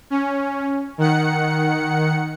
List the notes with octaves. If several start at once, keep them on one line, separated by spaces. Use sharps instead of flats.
C#4
D#3 F#5 C#7